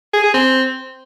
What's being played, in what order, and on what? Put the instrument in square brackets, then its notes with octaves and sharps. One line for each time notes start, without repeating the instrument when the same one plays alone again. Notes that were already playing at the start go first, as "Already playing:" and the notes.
[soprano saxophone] G#4
G#4
C4